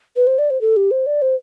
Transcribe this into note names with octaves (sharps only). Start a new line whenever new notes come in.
B4
C5
D5
C5
A4
G4
C5
D5
C5